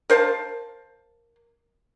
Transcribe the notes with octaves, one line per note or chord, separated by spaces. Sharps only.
A#4 C5 F5 A5